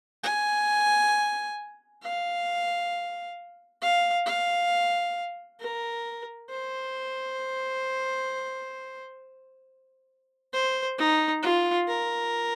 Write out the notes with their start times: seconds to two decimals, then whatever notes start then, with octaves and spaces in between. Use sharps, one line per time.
0.24 G#5
2.03 F5
3.82 F5
4.27 F5
5.61 A#4
6.51 C5
10.53 C5
10.98 D#4
11.43 F4
11.88 A#4